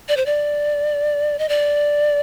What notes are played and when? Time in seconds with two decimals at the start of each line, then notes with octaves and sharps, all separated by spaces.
0.09 D5
0.17 C5
0.26 D5
1.39 D#5
1.49 D5